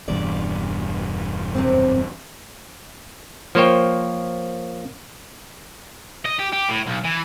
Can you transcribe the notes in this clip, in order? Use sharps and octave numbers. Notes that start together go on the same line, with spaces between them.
E1 E2 G2 D5
F#2 C3 C4
F3 A#3 C5 C#5 G5
D#5
G4
G4
A2
B1
E3